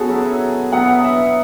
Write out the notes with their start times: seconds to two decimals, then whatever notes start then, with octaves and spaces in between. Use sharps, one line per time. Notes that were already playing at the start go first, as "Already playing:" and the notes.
Already playing: C#3 B3 F#4 G#4 A4
0.09 F#3 C#4 E4
0.72 B2 F#3 B3 E4 F#5
1.04 E5